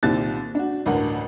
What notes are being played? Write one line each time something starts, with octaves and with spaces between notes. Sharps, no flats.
C2 A#2 D#3 C4 G4 A6
D4 F#4
A1 D2 G2 A#4 F#5